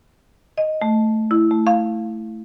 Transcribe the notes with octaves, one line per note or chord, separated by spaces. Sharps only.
D#5
A3
E4
A3
F5